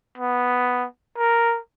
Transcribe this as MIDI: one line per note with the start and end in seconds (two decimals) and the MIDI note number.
0.18 0.85 59
1.18 1.59 70